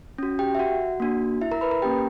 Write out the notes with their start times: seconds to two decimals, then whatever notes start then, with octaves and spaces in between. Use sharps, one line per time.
0.18 C#4 F#4
0.39 G4 G5
0.55 E5
0.59 F#4 F#5
1.00 A#3 D4 F#4
1.41 E4 E5
1.51 A#4 A#5
1.61 B4 B5
1.71 A#4 A#5
1.82 A#3 C#4 G4 G5